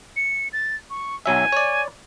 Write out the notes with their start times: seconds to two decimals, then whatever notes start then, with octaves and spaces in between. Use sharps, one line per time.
0.16 C#7
0.53 A6
0.90 C#6
1.26 B1 F#3 E5 G#5
1.52 C#5 D5